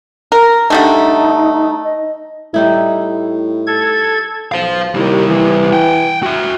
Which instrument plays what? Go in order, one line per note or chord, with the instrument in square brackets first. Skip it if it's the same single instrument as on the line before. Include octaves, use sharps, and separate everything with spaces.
[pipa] A#4
[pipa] D3 G3 A3 [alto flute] D#4
[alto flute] D#5
[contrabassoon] A2 [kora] G3 D#4 E4
[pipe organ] A4 G#6
[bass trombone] B1 [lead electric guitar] C5 F5
[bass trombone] D#2 [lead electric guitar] G3 E4
[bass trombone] E3
[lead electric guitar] F#5 G5
F#4 E5